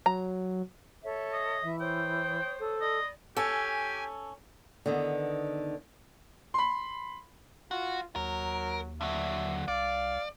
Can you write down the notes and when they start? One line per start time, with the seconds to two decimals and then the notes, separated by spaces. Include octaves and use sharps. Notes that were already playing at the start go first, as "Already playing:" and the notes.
0.06 F#3 A#5
1.04 A4 C#5 E5
1.33 D#5
1.62 E3 E5
1.80 C5 C#5 G5 D#6
2.59 A4
2.81 D5 D#5 B5
3.37 C#4 G4 A4 G#5
4.86 D3 D#3 B3
6.54 B5 C6
7.71 F4 F#4
8.16 D#2 F#3 A#4
9.01 D3 F#3 E5
9.68 C2 D5 F5